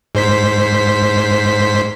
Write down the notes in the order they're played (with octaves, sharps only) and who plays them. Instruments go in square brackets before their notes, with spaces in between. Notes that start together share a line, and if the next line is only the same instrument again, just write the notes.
[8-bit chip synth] G#2 C5 B6